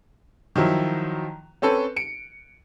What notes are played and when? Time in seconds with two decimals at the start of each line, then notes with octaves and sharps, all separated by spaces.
0.56 D#3 F3 F#3 E4
1.62 C4 C#4 A4 B4
1.96 C#7 D7